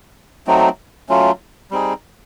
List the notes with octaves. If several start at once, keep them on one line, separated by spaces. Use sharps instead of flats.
F#3 A3 C4 D#4
F#3 A3 C#4 F4
G3 C4 D#4 G#4